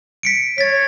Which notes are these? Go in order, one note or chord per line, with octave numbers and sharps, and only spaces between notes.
B6 C#7 D7
C#5 A6 B6